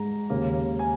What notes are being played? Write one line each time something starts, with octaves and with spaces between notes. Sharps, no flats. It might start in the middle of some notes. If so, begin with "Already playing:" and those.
Already playing: G#2 G#3 A#5
D#2 C#3 A#3
G#5